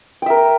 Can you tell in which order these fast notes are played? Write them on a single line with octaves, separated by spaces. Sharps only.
G5 E5 A#4